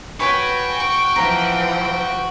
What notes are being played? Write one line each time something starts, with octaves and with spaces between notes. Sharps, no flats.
F#4 B4 C#5 G5 G#5
C#6
E3 F3 A#5